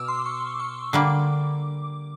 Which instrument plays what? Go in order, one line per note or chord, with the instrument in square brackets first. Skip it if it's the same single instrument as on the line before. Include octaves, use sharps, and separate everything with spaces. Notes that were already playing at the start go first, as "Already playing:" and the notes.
Already playing: [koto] B2 [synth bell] D6 E6 F6
[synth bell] C6
C#6
C#6
[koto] D3 G3 A#3 [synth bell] D6